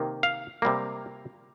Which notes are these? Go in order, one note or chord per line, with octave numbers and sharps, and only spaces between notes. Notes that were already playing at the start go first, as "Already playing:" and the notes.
Already playing: C3 D#3 A#3
F5
C3 G3 A#3